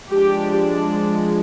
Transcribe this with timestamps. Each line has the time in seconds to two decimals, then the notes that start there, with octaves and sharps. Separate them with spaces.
0.10 F3 G#3 D4 G4